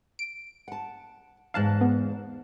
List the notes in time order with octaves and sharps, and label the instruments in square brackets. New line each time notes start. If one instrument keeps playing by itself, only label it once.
[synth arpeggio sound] D7
[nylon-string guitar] F#5 A5
[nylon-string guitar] E2 G#2 [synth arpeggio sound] F5 A5 F#6
[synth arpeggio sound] B3